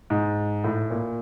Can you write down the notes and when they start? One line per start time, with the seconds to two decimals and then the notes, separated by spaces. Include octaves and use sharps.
0.10 G#2
0.64 A2
0.90 A#2